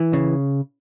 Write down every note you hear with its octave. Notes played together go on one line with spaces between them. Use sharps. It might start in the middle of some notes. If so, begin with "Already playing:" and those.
Already playing: E3
C#3